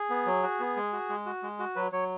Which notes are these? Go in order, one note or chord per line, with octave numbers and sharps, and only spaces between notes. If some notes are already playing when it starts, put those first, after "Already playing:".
Already playing: G#4
B3
F#3
F#4
B3
G#3
F#4
G#3
F#4
G#3
F#4
F#3 B4
F#3 C#5